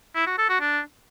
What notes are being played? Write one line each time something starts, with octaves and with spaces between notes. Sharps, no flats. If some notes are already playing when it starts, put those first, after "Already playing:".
E4
F#4
A4
F#4
D4